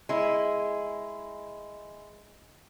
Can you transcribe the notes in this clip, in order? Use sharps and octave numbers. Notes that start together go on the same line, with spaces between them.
G#3 E4